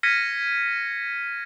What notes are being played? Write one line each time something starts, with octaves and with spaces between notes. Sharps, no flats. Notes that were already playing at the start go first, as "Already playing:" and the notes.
F6 G#6 A#6 B6 C#7 D#7